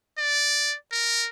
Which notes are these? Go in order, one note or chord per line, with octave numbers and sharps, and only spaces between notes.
D5
A#4